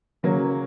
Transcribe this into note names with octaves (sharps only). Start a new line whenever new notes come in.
C#3 F#3 A#3 C#4